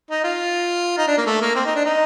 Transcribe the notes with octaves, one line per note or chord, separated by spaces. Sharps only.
D#4
F4
D#4
D4
A#3
A3
A#3
C4
D#4
D4
D#4